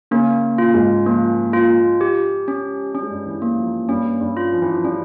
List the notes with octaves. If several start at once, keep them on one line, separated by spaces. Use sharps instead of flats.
C#3 A#3 C#4
F4
G#2 G#3
F3 A#3
F4
G4
C#4
G3 C#4
G#3
G2 G3
E3
A#3
F3
G2 G3 C#4
G2 G3
F4
F3
E3
F3
G3 C#4